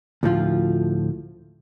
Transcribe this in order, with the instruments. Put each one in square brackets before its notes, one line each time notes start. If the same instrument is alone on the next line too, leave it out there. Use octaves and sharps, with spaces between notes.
[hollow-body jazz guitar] D2 A2 F3 F4